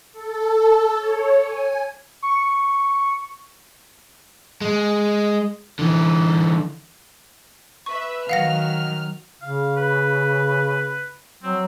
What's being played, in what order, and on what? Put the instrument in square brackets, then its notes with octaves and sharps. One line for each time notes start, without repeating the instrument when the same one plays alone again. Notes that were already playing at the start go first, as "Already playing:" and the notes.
[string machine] A4
C#5
G#5
[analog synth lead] C#6
[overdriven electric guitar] G#3
D3 E3
[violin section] B4 E5 [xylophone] C#6
[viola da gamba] D#3 F#3 [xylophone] F5 F#5 A#6 [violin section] F6
[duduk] C#3 [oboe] F5
[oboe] B4
[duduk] F#3 [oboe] C4